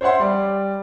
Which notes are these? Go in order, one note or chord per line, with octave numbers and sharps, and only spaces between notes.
C5 C#5 E5 F#5 C6
G3 D5